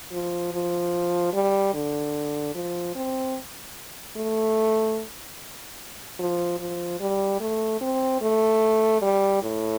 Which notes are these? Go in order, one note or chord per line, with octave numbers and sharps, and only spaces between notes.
F3
F3
G3
D3
F3
C4
A3
F3
F3
G3
A3
C4
A3
G3
A2